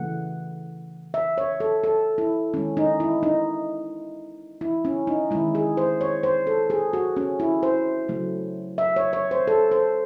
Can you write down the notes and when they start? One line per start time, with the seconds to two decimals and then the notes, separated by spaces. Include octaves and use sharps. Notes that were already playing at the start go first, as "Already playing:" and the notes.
Already playing: C#3 E3 A3 F#5
1.14 E5
1.38 C#5
1.60 A4
1.84 A4
2.18 E4
2.53 D#3 G#3 C#4
2.77 D#4
3.00 E4
3.23 D#4
4.61 E4
4.85 C#4
5.07 D#4
5.31 D#3 G#3 E4
5.55 G#4
5.77 C5
6.01 C#5
6.23 C5
6.47 A4
6.70 G#4
6.93 F#4
7.17 C#4
7.40 E4
7.63 C5
8.08 C#3 F#3 A3
8.78 E5
8.96 C#5
9.13 C#5
9.31 C5
9.47 A4
9.71 C5